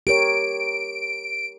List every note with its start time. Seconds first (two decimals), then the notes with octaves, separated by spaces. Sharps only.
0.07 G4 A#4 C#5 D7